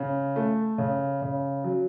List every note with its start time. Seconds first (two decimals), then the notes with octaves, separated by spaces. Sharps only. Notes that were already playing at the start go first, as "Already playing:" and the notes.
Already playing: C#3
0.36 A3
0.78 C#3
1.22 C#3
1.64 F#3